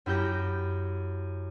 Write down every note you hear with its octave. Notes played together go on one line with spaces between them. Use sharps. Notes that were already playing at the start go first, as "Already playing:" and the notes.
F#2 E4 G4 G6 A#6